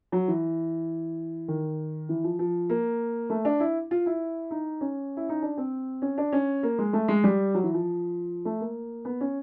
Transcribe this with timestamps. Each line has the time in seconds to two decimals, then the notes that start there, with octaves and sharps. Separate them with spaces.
0.12 F#3
0.28 E3
1.48 D#3
2.09 E3
2.24 F3
2.39 F3
2.70 A#3
3.30 A3
3.45 D4
3.60 E4
3.91 F4
4.06 E4
4.51 D#4
4.81 C#4
5.17 E4
5.29 D#4
5.42 D4
5.57 C4
6.02 C#4
6.18 D4
6.32 C#4
6.63 A#3
6.79 G#3
6.93 A3
7.08 G#3
7.24 G3
7.54 F#3
7.63 E3
7.74 F3
8.45 A3
8.60 A#3
9.05 B3
9.21 C#4